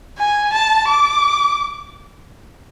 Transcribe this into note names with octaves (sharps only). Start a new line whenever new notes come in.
G#5
A5
D6